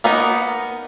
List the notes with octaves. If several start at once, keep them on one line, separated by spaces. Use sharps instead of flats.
A#3 B3 D#4